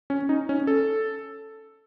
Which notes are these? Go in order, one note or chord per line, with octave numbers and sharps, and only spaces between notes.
C#4
D#4
C#4
A4